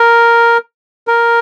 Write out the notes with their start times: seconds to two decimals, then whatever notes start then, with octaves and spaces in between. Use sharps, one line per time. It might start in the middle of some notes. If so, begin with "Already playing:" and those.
Already playing: A#4
1.08 A#4